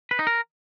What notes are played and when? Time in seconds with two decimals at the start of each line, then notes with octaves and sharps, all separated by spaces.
0.11 B4
0.19 D#4
0.27 A#4